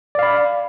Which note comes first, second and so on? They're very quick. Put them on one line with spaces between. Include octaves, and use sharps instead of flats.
D5 F5 B5